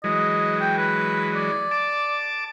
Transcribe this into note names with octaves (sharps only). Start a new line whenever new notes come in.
E3 F#3 G#3 D#5
G5
B4
D5
A5 D6